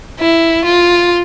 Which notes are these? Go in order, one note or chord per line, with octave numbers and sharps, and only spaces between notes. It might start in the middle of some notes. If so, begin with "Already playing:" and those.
E4
F4